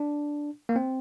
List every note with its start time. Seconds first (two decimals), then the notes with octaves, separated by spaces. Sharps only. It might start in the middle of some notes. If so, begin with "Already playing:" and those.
Already playing: D4
0.69 A#3
0.76 C4